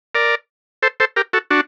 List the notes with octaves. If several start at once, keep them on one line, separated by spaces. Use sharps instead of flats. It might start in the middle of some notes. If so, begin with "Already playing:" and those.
A#4 D5
A4 C5
A4 C5
G4 A#4
F#4 A4
D4 F#4